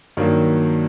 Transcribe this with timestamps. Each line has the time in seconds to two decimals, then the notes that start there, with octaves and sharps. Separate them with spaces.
0.17 G2 D#3 F#3 A#3